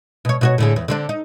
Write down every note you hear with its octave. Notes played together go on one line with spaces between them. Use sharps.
B2 C#5
B2 F#4 C#5
A2 D3 G#4
E2
D3 C4 D4
D#4